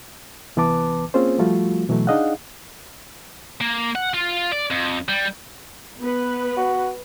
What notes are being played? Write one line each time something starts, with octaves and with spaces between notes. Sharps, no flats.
C2 E3 B3 B4 A5 D6
A#3 C4 C#4 F4 G#4 C5
F3 G3 A3 F4 F#4
B2 E3 F#3 A3
D4 D#4 G#4 D#5 F5 F#5
A#3
F#5
F4
D5
F2
G3
B3 B4
F#4